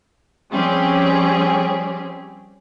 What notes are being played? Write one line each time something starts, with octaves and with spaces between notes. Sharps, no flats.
F3 G3 C4 C#4 G4 G#4